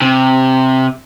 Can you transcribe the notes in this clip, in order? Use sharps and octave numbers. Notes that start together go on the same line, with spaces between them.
C3